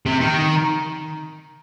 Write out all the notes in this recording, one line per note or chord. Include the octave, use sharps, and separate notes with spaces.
C3
D#3